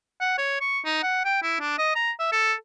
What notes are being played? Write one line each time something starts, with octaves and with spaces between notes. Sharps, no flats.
F#5
C#5
C#6
D#4
F#5
G5
E4
D4
D#5
A#5
E5
A4